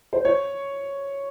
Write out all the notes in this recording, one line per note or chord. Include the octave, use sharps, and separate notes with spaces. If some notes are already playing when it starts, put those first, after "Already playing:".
C5
C#5